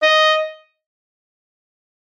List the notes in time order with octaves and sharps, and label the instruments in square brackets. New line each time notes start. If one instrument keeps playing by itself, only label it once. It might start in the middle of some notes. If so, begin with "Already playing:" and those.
[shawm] D#5